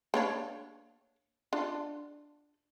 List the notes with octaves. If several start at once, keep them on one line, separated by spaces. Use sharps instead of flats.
A#3 D4 C#5
D4 F4